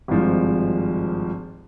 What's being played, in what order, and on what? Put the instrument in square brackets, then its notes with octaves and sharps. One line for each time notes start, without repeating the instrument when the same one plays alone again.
[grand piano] G#1 G2 F3 G#3